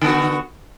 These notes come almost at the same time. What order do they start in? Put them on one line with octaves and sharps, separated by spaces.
D3 B3 F#4